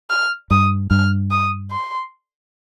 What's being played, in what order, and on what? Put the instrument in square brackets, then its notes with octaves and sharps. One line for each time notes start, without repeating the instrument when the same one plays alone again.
[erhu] F6
[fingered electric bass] G2 [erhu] D#6
[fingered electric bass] G2 [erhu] F6
[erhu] D#6
C6